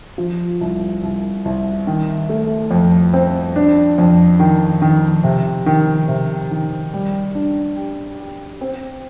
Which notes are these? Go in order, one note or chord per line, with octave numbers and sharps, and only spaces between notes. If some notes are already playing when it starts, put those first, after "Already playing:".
F3
C2
C2
C2
D#3
A3
F2
C4
D4
F2
D#3
D#3
C3
D#3
C3
D#3
G3
D4
G4
G4
C4